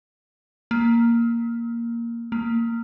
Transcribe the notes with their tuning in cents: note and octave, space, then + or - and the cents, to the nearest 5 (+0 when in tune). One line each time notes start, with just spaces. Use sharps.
A#3 +0
A#3 -15